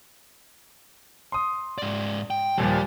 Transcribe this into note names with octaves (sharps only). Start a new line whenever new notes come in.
C6 D#6
G#2 D5
G5
D#2 A#2 F3 G3 G4